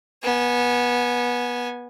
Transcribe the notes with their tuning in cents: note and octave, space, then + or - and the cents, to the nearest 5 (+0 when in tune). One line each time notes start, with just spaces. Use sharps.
B3 -20 G#5 +0